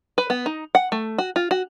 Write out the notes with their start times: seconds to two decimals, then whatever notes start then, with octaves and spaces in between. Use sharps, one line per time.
0.18 B4
0.30 B3
0.46 D#4
0.75 F#5
0.92 A3
1.18 F#4
1.36 F4
1.51 F#4